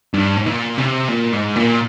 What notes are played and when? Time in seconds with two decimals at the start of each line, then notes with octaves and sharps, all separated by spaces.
0.14 G2
0.37 G#2
0.46 A#2
0.78 C3
1.09 A#2
1.33 G#2
1.56 A#2